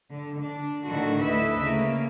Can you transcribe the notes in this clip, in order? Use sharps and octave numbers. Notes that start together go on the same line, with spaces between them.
D3
D4
A2 D3 D#3 F#4
D2 A3 E4 B4 D#5 E5
C#3 A3 A#3